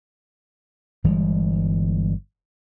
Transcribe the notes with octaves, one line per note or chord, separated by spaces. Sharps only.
G1 E3 G3 G#3